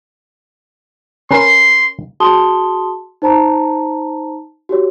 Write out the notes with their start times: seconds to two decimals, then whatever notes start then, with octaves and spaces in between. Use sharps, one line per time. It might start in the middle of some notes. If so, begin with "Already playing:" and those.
1.31 C#4 A#4 B4 C6
2.20 F#4 G#4 A5 C6 D#6 G7
3.22 D#4 C5 A5 A#5
4.69 F#4 G4 C#5